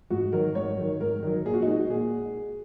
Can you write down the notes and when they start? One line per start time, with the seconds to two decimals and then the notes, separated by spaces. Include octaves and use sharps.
0.10 G#2 F#4
0.32 D#3 F#3 A#4
0.55 G#2 C#5
0.77 D#3 F#3
1.00 G#2 A#4
1.23 D#3 F#3
1.45 A#2 G#4
1.54 F#4
1.62 D#4
1.67 G#3 F#4
1.90 A#2 G#4